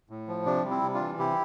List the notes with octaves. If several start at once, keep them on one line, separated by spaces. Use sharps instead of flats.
A2
F3
C3 D4
G3
C4 E4
C3
D4 F4
E3
C3 E4 G4